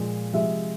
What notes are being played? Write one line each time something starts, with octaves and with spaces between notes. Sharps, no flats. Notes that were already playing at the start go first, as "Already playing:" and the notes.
Already playing: A#2 F3 G#3
C3 F3 G#3 E5